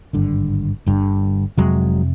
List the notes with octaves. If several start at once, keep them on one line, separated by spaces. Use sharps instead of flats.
G#1 G2 D3
G1 G2 D3
F1 F2 C3 F#3 G#3